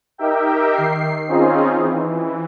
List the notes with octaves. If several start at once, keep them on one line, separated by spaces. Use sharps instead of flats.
D#4 G4 A#4 E5 G5
D#3 C7
C4 C#4 D#4 F4 G#4
E3